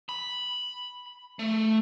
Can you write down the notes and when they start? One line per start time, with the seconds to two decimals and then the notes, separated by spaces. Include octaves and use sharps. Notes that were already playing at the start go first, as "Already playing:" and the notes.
0.09 B5
1.39 A3